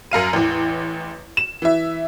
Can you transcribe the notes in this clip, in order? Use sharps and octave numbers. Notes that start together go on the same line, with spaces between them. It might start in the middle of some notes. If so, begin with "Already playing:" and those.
F#2 A#4 F5 D#7
A1 E2
E7
E3 E5